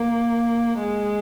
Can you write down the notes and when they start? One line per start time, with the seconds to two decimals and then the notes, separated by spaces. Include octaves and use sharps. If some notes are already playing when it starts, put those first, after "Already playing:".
Already playing: A#3
0.79 G#3